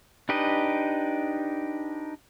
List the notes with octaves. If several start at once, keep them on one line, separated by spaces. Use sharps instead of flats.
D4 D#4 G4 B4 D#5